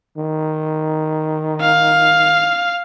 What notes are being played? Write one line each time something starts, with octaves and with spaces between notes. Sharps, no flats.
D#3
F5